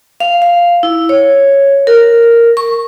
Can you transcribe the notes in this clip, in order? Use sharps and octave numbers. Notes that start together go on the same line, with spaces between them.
F5
F5
E4
C#5
A#4
C#6